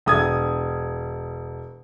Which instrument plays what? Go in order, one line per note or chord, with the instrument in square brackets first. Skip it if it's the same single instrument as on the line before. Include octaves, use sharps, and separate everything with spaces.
[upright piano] E1 D#6 G#6